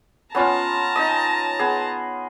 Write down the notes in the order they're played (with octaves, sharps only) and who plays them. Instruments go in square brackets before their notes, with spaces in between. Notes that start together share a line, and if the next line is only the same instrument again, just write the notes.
[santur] B3 C#4 F4 [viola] A5 A#5
[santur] D#4 D#5
B3 G#4